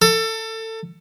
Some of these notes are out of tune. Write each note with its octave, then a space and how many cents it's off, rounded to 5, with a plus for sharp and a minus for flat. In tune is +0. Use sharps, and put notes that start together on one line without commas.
A4 +25